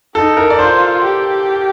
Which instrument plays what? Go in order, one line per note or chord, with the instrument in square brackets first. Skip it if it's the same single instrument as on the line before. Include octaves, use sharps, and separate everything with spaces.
[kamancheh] D#4 [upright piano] A4
[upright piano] A#4
D5
[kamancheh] F4 [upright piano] C5
[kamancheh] G4